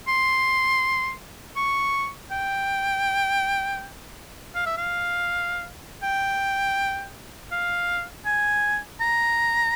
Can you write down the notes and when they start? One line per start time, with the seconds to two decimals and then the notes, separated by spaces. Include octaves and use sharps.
0.08 C6
1.56 C#6
2.31 G5
4.55 F5
4.66 E5
4.78 F5
6.03 G5
7.52 F5
8.25 G#5
9.01 A#5